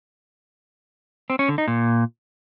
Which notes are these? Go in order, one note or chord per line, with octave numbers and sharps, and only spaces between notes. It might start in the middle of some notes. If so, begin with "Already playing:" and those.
C4
C#4
D3
D#4
A#2